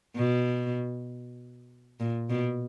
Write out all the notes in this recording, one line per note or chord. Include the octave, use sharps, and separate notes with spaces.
B2
A#2
B2